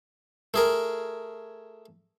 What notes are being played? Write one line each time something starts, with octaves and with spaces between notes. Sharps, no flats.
A3 G#4 A#4